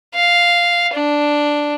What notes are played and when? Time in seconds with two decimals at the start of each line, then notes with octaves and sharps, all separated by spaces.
0.15 F5
0.94 D4